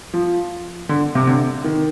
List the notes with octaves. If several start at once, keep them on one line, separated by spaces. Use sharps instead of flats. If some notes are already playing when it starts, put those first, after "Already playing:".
F3
D3
C3
D3
D#3